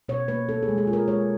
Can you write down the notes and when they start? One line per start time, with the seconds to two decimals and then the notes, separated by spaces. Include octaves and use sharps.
0.09 B2 C#5
0.28 A#3 B4
0.49 C4 A4
0.63 G#4
0.68 G#3
0.78 G#4
0.87 F4
0.93 A#4
1.08 G#3 C#5